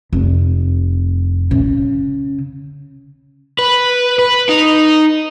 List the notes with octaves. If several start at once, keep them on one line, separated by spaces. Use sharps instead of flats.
F1
C#3
B4
B4
D#4